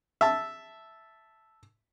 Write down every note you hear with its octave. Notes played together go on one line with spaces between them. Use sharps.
E5 A5